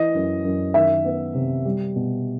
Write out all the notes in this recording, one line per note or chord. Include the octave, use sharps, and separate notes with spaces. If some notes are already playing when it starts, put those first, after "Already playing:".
Already playing: E3 D#5
F#2
F#2
D#3 E5
B3
C3
G3
B2